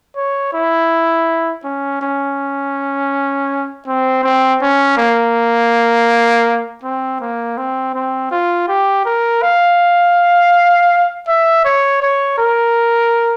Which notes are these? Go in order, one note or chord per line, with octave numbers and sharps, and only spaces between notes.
C#5
E4
C#4
C#4
C4
C4
C#4
A#3
C4
A#3
C4
C4
F4
G4
A#4
F5
E5
C#5
C#5
A#4